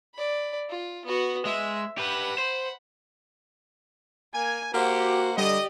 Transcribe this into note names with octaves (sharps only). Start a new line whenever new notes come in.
D5 B5
F4
B3 F#4
G#3 E5
G4 B4 F#5 B5
C5
A#3 G#5 G#6
A#3 F#4 G4 C5 F#5
D3 G3 G4 D5 D#5